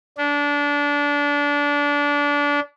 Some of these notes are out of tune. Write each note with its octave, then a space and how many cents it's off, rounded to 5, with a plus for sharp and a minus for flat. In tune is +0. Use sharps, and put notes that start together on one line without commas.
D4 -25